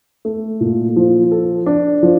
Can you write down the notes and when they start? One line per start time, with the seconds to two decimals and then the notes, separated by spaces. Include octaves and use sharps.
0.25 A3
0.61 A#2
0.96 F3
1.31 A4
1.66 D4
2.03 F3